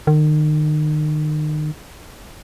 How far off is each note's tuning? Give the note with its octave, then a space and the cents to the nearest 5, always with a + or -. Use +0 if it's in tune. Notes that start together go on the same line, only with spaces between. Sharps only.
D#3 -35